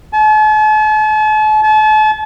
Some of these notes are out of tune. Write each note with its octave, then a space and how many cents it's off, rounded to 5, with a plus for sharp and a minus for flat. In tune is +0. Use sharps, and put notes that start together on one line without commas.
A5 -45
A5 -40